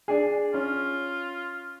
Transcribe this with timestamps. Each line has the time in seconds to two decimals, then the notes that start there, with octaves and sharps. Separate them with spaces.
0.08 D4 G#4
0.54 C#4 F4